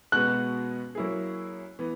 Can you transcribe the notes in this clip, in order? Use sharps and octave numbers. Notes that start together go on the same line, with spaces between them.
B2 G#3 B3 F#4 F#6
F#3 A#3 E4 G#4
E3 B3